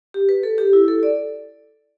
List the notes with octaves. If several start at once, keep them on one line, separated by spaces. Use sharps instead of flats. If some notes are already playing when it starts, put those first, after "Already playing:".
G4
B4
A4
G4
E4
A4
D5